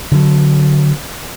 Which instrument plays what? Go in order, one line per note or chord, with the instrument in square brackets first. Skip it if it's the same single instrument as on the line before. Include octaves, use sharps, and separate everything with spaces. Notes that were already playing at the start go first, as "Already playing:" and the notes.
[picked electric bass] D3 F#3